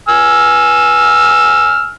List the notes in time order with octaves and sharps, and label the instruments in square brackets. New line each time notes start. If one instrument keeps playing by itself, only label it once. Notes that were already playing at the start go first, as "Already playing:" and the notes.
[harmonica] G#5 E6 F6